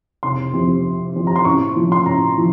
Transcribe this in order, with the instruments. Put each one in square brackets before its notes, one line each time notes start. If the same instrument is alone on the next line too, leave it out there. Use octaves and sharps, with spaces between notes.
[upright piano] F1 C6
F2 C3
F1
F2 C3
A#5
C6
A1 C#6
A2 F3
C6
A1 A#5
F3